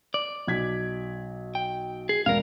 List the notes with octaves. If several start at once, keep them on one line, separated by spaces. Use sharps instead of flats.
D5
B1 G#6 B6
G5
G#4
E1 A#4 F5